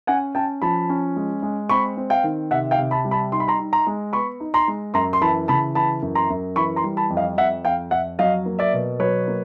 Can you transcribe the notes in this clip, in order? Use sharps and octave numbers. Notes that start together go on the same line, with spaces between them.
C#4 F#5 G#5
C#4 G5 A5
F3 A5 B5
C#4
G#3
G#3
C4 B5 C#6
C4
F5 G5
D#3
C3 E5 F#5
F5 G5
C3
A5 B5
G3
A5 B5
D#4 C6
B5
A#5 C6
D#4
A#5 C6
G#3
B3 B5 C#6
D#4
A#5 C6
G#3
F#2 A#5 C6
C6
E3 A5 B5
C#3 A5 B5
E3 A5 B5
F#2
A#5 C6
F#2
E3 B5 C#6
A#5 C6
G3
A5 B5
F2
D#5 F5
F2 E5 F#5
F2 F5 G5
F2 E5 F#5
F#3 D#5 F5
A#3
D5 E5
B2
F#3 B4 C#5
A#3